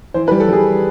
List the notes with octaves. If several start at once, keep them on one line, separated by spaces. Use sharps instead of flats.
E3 C5
B4
G3
A4
G3 G#4